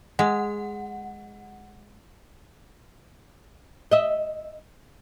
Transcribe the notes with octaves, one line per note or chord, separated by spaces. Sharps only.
G#3 F#5
D#5 E5